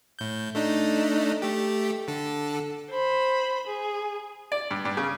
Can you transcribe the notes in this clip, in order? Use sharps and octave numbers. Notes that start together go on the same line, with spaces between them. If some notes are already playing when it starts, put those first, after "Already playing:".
A2 G6
A3 D4 D#4
A3 G4
D3 A4
C5 B5
G#4
D5
G2
G2
C#3